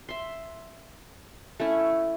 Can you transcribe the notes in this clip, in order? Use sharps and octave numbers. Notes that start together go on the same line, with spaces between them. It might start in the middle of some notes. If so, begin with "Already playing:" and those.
E5 C6
A3 C#4 E4